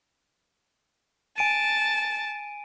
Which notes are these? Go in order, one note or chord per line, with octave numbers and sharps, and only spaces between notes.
G#5 A5 D7 D#7